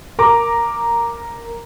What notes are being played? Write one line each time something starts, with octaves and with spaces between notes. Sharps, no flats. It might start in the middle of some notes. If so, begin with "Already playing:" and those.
A#4 A#5 D6